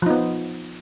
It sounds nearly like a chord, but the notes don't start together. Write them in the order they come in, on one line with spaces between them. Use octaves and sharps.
F3 D#4 B3